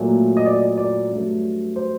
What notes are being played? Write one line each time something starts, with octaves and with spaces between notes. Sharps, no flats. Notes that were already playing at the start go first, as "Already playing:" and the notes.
Already playing: A#2 F#3 A3
D#5
D5
D5
G2 F#3 A3
C5